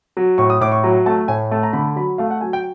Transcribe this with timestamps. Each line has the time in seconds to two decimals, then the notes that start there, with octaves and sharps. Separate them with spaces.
0.17 F#3
0.38 A2 C#6
0.50 D#6
0.61 A2 D6
0.72 C#6
0.83 F#3 A#5
1.06 A3 A5
1.28 A2 G#5
1.51 A3 A5
1.63 A#5
1.73 D3 B5
1.96 F#3 B5
2.18 A3 F5
2.30 F#5
2.41 F#3 G#5
2.53 G5